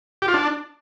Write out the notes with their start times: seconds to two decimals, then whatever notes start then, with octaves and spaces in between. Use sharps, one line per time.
0.22 G4
0.28 F4
0.34 D4